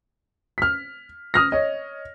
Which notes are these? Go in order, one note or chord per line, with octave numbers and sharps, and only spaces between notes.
F6 B6
D#6 F6 A#6
C#5 D#5